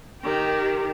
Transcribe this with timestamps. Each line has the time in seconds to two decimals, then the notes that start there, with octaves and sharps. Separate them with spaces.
0.22 D#3 G4